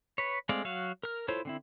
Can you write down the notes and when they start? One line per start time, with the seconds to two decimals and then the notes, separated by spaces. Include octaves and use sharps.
0.18 B4 C#5
0.49 G#3 A3 C4 D5 F5
0.65 F#3 F#4 F5
1.03 A#4 F6
1.28 E4 F4 A4 C5 C#5
1.45 D3 C4 E4